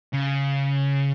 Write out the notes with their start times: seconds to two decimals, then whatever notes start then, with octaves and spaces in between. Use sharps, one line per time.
0.13 C#3